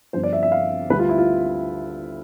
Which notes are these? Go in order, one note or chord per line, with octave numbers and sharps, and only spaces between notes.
G1 G2 F3 C5
D5
E5
E5
F5
D2 D3 G3 B4
F4
E4
F4